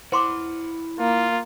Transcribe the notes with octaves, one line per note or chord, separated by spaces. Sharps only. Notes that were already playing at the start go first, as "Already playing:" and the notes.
E4 C5 F#5 C6 D6
A#3 F4